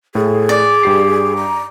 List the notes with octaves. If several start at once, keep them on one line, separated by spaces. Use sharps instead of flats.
A2 G#4 A4
D5
G2 G4 C7
A#5